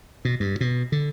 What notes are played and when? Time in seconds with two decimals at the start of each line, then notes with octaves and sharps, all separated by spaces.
0.25 B2
0.40 G2
0.61 B2
0.92 D3